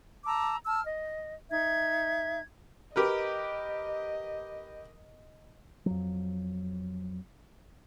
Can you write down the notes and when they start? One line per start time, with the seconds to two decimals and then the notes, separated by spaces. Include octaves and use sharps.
0.25 A5 A#5 D6 E6
0.65 A5 E6 F6
0.86 D#5
1.50 D#4 E5 G#6
2.96 G4 A#4 B4 D#5
5.86 F2 F#3